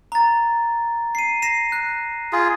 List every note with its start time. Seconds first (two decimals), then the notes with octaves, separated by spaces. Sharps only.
0.12 A#5 A6
1.15 C7 D#7
1.42 A#6 C7 E7
1.72 F#6
2.33 F4 G#4